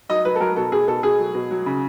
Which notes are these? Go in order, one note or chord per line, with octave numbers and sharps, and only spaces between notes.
F#3 D#5
F#3 B4
A4
F#3 A#4
B2 A4
B2 G#4
B2 A4
B2 G#4
F#3
B2
F#3
C#3